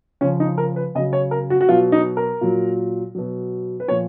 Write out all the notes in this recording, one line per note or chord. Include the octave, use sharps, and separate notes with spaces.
C#3 F3 C#4
D#4
A#4
B4
C#3 F#3 D#5
C#5
A#4
F#4
F#4
B2 F#3 F4
D#4
A#4
A#2 F#3
B2 F#3
B4
A#2 F3 C#5